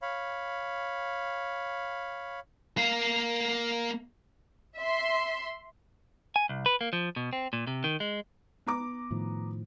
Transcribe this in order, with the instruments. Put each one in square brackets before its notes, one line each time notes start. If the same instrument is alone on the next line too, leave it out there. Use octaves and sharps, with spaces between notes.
[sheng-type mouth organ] C#5 F5 B5
[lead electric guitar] A#3 F5
[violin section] E5 C6
[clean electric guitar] G#5
C2
B4
A#3
F3
B2
C4
A#2
C3
D#3
G#3
[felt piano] B3 A#5 D6
[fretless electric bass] A2 D#3 F3